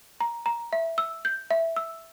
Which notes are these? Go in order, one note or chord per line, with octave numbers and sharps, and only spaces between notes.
A#5
A#5
E5
E6
G6
E5
E6